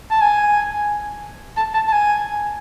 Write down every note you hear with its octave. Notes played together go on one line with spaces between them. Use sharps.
A5
G#5
A5
A5
A5
G#5